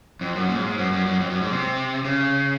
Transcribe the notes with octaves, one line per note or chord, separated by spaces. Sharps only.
F2
F#2
A#2
G#2
F#2
F#2
F#2
F2
F#2
G#2
C3
C#3